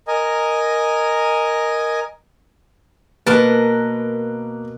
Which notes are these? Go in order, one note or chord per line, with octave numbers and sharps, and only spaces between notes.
A#4 D#5 G#5
B2 A#3 A#4 B4 A5